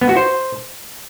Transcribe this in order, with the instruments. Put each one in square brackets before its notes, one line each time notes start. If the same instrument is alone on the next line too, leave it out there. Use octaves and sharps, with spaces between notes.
[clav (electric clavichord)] B3
F#4
C5